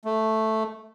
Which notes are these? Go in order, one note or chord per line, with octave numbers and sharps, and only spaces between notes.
A3